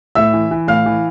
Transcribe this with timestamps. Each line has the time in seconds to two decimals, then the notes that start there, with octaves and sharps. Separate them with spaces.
0.15 A2 E5 E6
0.33 E3
0.51 E3
0.68 A2 F5 F6
0.86 E3